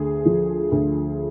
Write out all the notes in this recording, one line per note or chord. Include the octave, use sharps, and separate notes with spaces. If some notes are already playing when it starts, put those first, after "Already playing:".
Already playing: D2 G#4
F3
D2